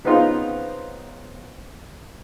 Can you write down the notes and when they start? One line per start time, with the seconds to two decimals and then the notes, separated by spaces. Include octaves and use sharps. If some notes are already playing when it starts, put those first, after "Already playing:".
0.04 C#3 B3 C4 D#4 F4